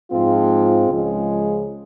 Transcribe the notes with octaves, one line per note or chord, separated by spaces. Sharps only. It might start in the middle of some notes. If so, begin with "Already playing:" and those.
G#2 F3 G#3 C4 F4
C#2 C#3 F3 G#3